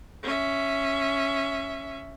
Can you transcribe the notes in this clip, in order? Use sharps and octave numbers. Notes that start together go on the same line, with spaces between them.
C#4 E5